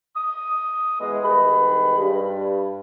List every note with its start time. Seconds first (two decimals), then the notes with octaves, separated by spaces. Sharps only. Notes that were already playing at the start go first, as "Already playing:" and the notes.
0.15 D#6
1.00 B2 E3 G#3
1.23 C2 D#3 G#3 B4 B5
1.97 G2